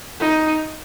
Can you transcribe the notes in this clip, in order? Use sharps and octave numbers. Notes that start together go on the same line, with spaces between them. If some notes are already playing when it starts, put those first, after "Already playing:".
D#4